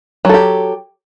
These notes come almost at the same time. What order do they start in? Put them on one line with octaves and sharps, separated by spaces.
F#3 A4 G4